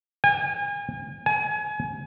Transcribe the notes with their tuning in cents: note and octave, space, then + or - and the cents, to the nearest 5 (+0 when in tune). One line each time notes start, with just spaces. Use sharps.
G#5 -35
G#5 +30